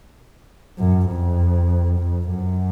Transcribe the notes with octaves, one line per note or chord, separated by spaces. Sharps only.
F#2
F2
F2
F#2